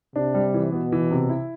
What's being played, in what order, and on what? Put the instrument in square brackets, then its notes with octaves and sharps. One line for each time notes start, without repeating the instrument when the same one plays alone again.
[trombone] C3 [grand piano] D4
[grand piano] G3
E3
[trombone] B2 [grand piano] B3
[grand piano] E3
C3
E4